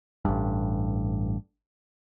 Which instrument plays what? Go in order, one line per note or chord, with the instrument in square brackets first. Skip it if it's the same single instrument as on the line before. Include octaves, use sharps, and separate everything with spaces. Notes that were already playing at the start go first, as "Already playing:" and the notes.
[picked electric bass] A1 G2